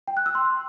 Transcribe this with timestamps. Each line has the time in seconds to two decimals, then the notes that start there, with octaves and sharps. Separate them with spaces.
0.08 G5
0.17 F#6
0.26 E6
0.35 C6